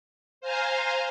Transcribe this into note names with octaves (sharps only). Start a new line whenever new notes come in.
C5 F5 G#5 A#5 C6